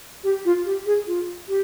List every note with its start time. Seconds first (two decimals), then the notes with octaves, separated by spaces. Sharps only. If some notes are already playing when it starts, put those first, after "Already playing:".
0.24 G4
0.45 F4
0.66 G4
0.86 G#4
1.07 F4
1.48 G4